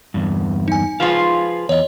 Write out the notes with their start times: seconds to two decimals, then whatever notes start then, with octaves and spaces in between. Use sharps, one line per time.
0.14 E2 G2
0.68 D#4 G#5
1.00 F3 F4 G#4 B4 F5
1.69 E2 C#5 D#5